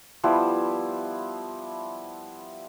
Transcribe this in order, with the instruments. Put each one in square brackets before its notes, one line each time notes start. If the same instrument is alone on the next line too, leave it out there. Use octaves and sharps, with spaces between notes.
[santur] F3 G3 B3 E4